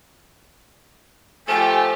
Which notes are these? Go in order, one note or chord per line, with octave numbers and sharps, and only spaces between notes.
F3 A3 G4 G#5